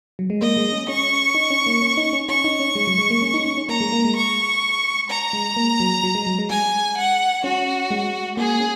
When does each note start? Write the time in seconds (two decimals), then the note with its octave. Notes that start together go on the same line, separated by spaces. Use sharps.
0.19 F#3
0.30 G#3
0.41 A#3 D#5
0.57 G#3
0.72 C#4
0.88 C#4 C#6
1.35 D#4
1.50 C#4
1.66 A#3
1.82 C#4
1.97 D#4
2.13 C#4
2.29 C#4 C#6
2.44 D#4
2.60 C#4
2.76 G#3
2.87 F#3
2.98 G#3
3.10 A#3
3.22 C#4
3.34 D#4
3.46 C#4
3.58 C#4
3.68 A#3 A#5
3.80 G#3
3.92 A#3
4.05 G#3
4.16 C#6
5.10 A#5
5.33 G#3
5.56 A#3
5.80 F#3
6.03 F#3
6.15 G#3
6.27 F#3
6.38 G#3
6.50 G#3 G#5
6.97 F#5
7.44 C#4 F#4
7.91 G#3
8.37 A#3 G#4
8.60 C#4